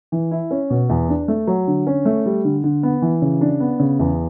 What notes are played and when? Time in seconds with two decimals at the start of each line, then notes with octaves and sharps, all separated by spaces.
0.12 E3
0.31 E4
0.51 C#4
0.70 B2
0.89 E2
1.09 D4
1.28 A3
1.47 F#3
1.67 D3
1.87 C#4
2.05 A3
2.26 G3
2.44 D3
2.64 D3
2.83 B3
3.02 E3
3.22 C#3
3.41 D4
3.60 B3
3.80 C#3
3.99 E2